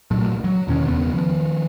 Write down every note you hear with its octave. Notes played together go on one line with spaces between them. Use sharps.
C2 A#2 F#3 A3
F#3
E2 B2 D#3 C#4
E1 E2 C#3 B3
D#3 F3